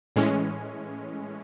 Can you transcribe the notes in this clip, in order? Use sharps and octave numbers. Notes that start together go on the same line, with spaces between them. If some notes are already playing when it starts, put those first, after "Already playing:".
A2 E3 G#3 C#4